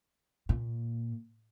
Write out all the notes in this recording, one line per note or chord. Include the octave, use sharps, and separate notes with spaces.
A#2